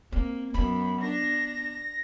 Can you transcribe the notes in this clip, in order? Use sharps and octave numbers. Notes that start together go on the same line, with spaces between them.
A#3 C4
F#2 B3 B5
D4 A#6